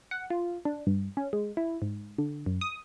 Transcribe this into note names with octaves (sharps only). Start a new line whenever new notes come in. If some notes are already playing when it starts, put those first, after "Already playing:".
F#5
F4
D4
G2
C#4
G#3
E4
G#2
D3
F#2
D#6